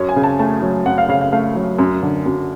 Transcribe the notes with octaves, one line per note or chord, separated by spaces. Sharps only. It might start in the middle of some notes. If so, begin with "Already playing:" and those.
Already playing: F#2 C#5
G#5
C#3
A5
A3 A5
F#3
F#2 F#5
F5
C#3 F5
F5
A3 F5
F#3
F#2
D3
F#2